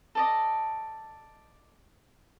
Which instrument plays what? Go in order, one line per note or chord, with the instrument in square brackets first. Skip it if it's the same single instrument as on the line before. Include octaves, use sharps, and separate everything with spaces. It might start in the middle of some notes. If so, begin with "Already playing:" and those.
[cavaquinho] A4 D5 D#5